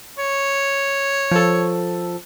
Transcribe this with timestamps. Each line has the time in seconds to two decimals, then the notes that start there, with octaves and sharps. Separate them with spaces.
0.18 C#5
1.31 F3 A4